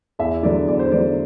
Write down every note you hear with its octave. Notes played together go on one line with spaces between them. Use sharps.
E2 E5
D3 F#3 B3 D5
E2 D5
C5
D3 F#3 B3 D5